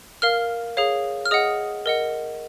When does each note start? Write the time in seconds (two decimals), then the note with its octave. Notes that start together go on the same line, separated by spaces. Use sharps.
0.22 A#4 F5 F6
0.77 G#4 C#5 F5
1.26 F6
1.31 G#4 D#5 F#5 D#6
1.86 A#4 D#5 F#5